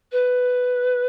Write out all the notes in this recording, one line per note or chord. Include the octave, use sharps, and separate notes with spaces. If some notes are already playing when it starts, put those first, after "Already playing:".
B4